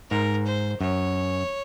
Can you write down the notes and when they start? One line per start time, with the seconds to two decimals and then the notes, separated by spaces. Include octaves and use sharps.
0.10 G#2 A#4
0.46 C5
0.80 F#2 C#5